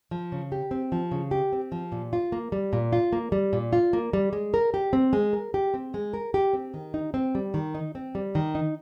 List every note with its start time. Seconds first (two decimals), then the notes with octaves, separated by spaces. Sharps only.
0.11 F3
0.32 C#3
0.52 G4
0.71 C4
0.92 F3
1.11 C#3
1.31 G4
1.53 C4
1.72 F3
1.92 A#2
2.13 F4
2.32 A#3
2.52 G3
2.73 A#2
2.93 F4
3.13 A#3
3.32 G3
3.53 A#2
3.73 F4
3.93 A#3
4.13 G3
4.33 G#3
4.54 A#4
4.74 G4
4.93 C4
5.13 G#3
5.33 A#4
5.54 G4
5.74 C4
5.94 G#3
6.14 A#4
6.34 G4
6.53 C4
6.74 D#3
6.94 D#4
7.14 C4
7.35 G3
7.54 D#3
7.74 D#4
7.95 C4
8.15 G3
8.35 D#3
8.55 D#4